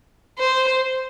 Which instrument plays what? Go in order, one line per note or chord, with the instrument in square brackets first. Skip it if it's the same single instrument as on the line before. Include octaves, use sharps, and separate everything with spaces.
[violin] C5